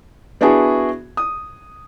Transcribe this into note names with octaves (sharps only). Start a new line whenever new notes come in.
B3 D4 E4 F#4 G#4
D#6